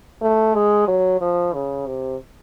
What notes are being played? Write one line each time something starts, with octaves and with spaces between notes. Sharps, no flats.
A3
G#3
F#3
F3
C#3
C3